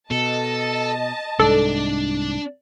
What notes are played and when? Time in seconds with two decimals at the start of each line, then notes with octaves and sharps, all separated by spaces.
0.11 B2 A4 D#5 A5
1.39 C2 G#2 D4 A4 D5